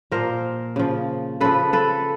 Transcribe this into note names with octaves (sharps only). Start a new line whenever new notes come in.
A#2 F3 A#4 C5
C#3 F3
C#3 F3 A4 B4
A4 B4